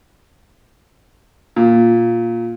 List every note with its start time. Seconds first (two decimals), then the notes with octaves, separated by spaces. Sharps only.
1.56 A#2